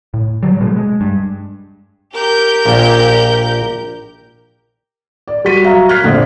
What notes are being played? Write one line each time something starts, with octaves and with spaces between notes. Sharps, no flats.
A2
D3 F#3 G3
B2 F#3 G#3 A3
G#3
G2
G4 A#4 G6
A#1 A#2
D5
G3 F#4 B6 D#7
F#3 E5 F5 A#5
F6 F#6 G#6 B6 C7
A#1 F2 D3